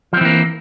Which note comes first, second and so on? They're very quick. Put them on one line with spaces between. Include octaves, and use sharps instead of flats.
F3 C4 E3 A#3